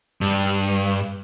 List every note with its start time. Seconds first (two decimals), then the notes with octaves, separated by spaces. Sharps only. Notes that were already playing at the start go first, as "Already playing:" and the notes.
0.21 G2